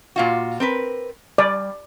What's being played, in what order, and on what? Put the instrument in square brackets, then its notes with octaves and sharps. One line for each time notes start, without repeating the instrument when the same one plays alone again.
[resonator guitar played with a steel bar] A#2 F4 F#4
C4 A#4 B4
[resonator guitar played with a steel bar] G3 [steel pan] D5